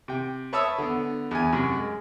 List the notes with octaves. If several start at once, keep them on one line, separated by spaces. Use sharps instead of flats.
C3 G5
B4 C#5 E5 A5 D#6 E6
D3 B3
E2 G#5
F#2 C3
G#3